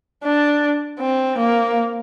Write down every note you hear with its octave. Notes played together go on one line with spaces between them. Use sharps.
D4
C4
A#3